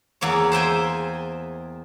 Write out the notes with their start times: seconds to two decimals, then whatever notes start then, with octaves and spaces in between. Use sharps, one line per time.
0.21 E2 A#3 G#4 C#5
0.52 C5 E5 G5 G#5